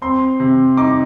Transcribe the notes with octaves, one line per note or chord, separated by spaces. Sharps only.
C4 C6
C3
D#4 D6